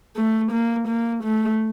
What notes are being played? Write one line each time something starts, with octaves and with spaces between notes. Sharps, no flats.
A3
A#3
A#3
A3